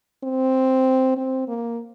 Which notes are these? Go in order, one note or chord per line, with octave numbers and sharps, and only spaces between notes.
C4
C4
A#3